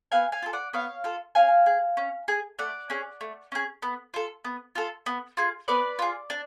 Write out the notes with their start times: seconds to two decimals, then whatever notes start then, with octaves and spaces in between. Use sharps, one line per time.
0.12 B3 F5 G#5
0.32 F5 G#5
0.43 F4 A4
0.53 D5 F#5
0.73 B3 C#5 F5
1.04 F4 A4
1.35 C#4 F5 G#5
1.66 G#4
1.97 C#4
2.28 G#4
2.59 A3 D5 F#5
2.90 C#4 G#4
3.21 A3
3.52 C#4 G#4
3.82 B3
4.14 F4 A4
4.45 B3
4.75 F4 A4
5.06 B3
5.37 F4 G#4
5.68 B3 B4 D5
5.99 F4 G#4
6.30 D4